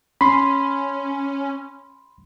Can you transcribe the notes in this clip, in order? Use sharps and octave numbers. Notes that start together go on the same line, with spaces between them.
C#4 B5 C6